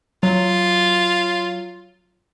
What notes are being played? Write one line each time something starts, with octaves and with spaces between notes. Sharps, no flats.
F#3 F4